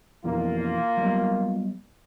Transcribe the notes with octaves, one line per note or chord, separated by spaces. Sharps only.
F2 B2 E3 A#3 F4
F#3 G3 B3